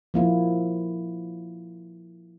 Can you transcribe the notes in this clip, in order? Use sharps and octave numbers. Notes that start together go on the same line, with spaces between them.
F3 A#3 E4